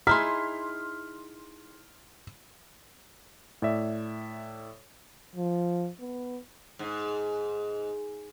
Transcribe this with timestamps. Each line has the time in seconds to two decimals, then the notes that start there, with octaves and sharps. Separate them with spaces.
0.07 D#4 E4 G#4 C6 F6 B6
3.62 A2 D5 E5
5.36 F3
6.00 B3
6.79 G#2